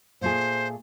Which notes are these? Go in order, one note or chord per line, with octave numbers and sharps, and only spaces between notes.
A#2 A3 G#4 C5